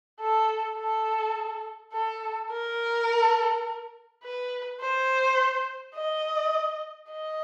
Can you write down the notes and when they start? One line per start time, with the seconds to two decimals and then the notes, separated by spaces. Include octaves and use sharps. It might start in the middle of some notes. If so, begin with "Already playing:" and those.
0.21 A4
0.78 A4
1.93 A4
2.51 A#4
4.23 B4
4.80 C5
5.95 D#5
7.11 D#5